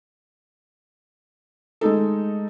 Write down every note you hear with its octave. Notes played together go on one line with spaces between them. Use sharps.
G#3 A3 D#4 A4